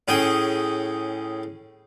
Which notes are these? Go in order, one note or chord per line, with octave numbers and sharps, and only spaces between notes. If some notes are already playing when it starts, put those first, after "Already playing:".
A2 C#4 G#4 G5